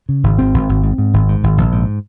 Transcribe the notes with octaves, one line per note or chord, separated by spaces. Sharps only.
C#3
G#1
G#1 C4
G#1
G#1
G#2
G#2
G#1
G#2
G#1
A#1
G#2